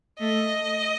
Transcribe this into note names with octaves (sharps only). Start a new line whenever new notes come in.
A3 D#5